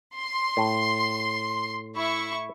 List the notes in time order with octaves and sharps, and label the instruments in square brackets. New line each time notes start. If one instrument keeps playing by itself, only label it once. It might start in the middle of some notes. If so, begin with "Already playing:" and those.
[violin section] C6
[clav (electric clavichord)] A2
[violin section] E4 C#6